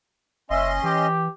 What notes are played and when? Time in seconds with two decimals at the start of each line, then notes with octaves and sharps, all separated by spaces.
0.50 F#1 C#4 D#5 E5 C6
0.84 E3 G4